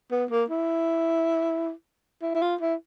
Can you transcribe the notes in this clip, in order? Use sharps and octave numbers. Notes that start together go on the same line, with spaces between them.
B3
A#3
E4
E4
E4
F4
E4